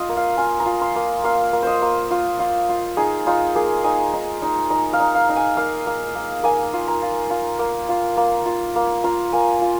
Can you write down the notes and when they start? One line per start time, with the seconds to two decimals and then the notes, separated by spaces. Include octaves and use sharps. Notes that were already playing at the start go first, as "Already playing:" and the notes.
Already playing: F4 D#5
0.09 A#3
0.16 F5
0.37 F4 G#5
0.60 A#5
0.66 F4
0.81 C6
0.96 A#3
1.24 A#3 F5
1.53 A#3
1.63 C5 D#5
1.82 A#3
2.11 F4
2.39 F4
2.69 F4
2.97 D#4 G#4
3.27 D#4 F4
3.55 A#3 G#4
3.84 D#4 G#5
4.14 D#4
4.42 D#4
4.70 D#4 A#5
4.93 F5
5.00 D#4
5.15 F5
5.29 D#4
5.36 G#5
5.57 A#3 F5
5.87 A#3
6.15 A#3
6.43 A#3 G#5
6.73 F4
6.88 A#5
7.02 F4
7.30 F4
7.59 A#3
7.89 F4
8.17 A#3
8.46 F4
8.76 A#3
9.04 F4 A#5
9.33 A#3 G#5
9.61 F4